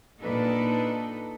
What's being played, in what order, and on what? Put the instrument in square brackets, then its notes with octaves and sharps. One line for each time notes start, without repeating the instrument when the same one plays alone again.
[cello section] A#2 D4 D#4 A4 B4